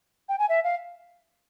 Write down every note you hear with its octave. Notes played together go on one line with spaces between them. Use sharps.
G5
G#5
E5
F5